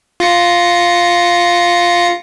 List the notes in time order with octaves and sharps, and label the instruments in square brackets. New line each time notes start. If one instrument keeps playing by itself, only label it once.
[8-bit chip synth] F4 A#6 C#7